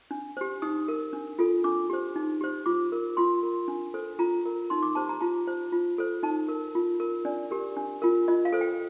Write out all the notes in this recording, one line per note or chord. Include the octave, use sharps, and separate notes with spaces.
D4
G4 C5
D#4 D#6
A#4
D4
F4 A4
D4 D6
G4 C5
D#4
G4 C5
F4 D6
A#4
F4 C6
A#4
D4
A4 C5
F4 A#5
A#4
D#4 C6
D6
G4 C5 A5
A#5
F4 A5
C5
F4
A4 C5
D#4 A5
A#4
F4
A#4
D4 D5
G4 A#4
D4
F4 A#4
F4 D#5
F5
A4 C5
G5